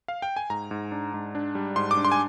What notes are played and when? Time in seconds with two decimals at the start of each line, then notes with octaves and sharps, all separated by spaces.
0.08 F5
0.22 G5
0.36 G#5
0.50 G#2 A#5
0.71 G#2
0.92 D4
1.14 G#2
1.35 D4
1.55 G3
1.76 G#2 C6
1.91 D6
1.97 D4
2.05 C6
2.12 G#5